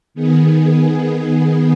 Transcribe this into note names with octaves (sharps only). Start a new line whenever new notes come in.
D#3 B3 G#4